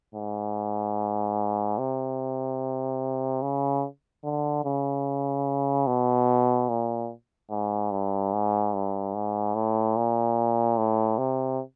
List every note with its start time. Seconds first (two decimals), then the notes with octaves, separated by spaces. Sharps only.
0.15 G#2
1.78 C3
3.42 C#3
4.24 D3
4.65 C#3
5.87 B2
6.69 A#2
7.51 G#2
7.91 G2
8.33 G#2
8.74 G2
9.15 G#2
9.55 A2
9.97 A#2
10.78 A2
11.18 C3